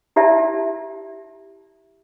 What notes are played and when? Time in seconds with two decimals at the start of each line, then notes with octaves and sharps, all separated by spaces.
0.16 E4 G4 D5 E5 A5